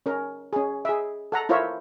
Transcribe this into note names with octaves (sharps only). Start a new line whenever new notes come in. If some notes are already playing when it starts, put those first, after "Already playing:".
C#4 A#4
C#4 G#4
G#4 E5
A4 F#5 A#5
E4 F4 A#4 C5 C#5 E5